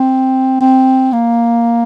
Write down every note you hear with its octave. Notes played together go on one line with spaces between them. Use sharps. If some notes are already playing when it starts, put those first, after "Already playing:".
Already playing: C4
C4
A#3